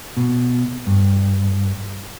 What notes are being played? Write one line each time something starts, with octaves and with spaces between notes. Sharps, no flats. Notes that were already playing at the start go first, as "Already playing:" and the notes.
B2
G2